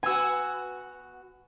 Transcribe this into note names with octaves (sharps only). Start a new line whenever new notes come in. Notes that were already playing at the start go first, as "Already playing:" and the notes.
B3 F#4 G#5 E6